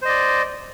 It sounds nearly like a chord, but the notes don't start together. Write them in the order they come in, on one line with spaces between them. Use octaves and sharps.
C5 D#5 D5